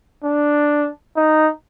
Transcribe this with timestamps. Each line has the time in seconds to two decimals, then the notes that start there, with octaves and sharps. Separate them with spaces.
0.24 D4
1.16 D#4